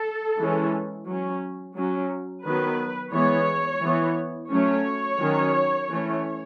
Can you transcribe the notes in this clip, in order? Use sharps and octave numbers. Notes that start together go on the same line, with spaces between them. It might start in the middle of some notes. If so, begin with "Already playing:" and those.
Already playing: A4
E3 G#3 C#4
F#3 C#4
F#3 C#4
D#3 F#3 B3 B4
E3 G#3 B3 C#5
E3 B3
F#3 A3 C#4 C#5
D#3 F#3 C#4
E3 A3 C#4